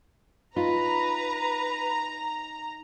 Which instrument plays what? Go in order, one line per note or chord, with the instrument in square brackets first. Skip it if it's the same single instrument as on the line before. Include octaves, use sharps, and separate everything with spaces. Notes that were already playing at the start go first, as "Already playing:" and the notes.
[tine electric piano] D#4 [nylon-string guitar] F4 [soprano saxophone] B4 [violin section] A#5